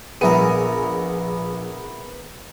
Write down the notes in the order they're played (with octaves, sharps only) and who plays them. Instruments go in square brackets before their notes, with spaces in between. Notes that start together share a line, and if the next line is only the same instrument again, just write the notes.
[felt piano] A#1 D#7 [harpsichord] B3 A#4 [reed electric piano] G#4 E5